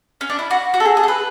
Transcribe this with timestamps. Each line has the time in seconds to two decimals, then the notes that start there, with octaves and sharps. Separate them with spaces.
0.21 C#4
0.30 D4
0.39 E4
0.51 F#4
0.74 F#4
0.80 A4
0.85 G#4
0.97 G#4
1.03 A4
1.08 B4